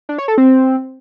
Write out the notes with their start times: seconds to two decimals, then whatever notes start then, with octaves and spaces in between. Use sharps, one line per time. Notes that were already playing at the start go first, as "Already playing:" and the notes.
0.09 D4
0.18 C#5
0.28 A4
0.38 C4